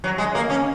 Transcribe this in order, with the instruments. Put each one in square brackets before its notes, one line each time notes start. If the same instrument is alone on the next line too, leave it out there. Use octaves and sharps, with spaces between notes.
[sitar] F#3
G#3
A#3
C#4